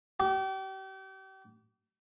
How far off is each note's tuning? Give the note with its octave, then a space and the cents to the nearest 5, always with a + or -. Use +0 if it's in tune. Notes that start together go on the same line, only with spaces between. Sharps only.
G4 -35